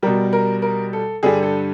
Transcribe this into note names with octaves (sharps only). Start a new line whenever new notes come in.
B2 G3 A#4
A#4
A#4
A4
G2 D3 G3 G#4
A4